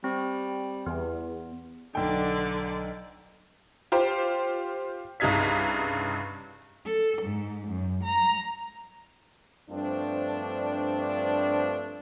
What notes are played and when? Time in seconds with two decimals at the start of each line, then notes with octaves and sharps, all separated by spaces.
0.04 G3 C4
0.86 E2 B3
1.95 B1 D3 D5 G5
3.92 F4 G4 C5
5.20 C2 G2 C#3 D#4 G#6 B6
6.86 A4
7.22 G#2
7.68 F#2
8.04 A#5
9.70 G2 F3 A3 C4 D4